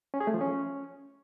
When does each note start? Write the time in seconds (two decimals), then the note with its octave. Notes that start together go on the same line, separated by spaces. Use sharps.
0.14 C#4
0.20 G#4
0.27 A3
0.34 F3
0.41 C#4